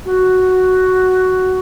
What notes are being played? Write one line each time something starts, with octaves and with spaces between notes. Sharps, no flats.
F#4